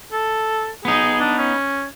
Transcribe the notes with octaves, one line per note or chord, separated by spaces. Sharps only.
A4
B3 D#4 G#4
D4
C#4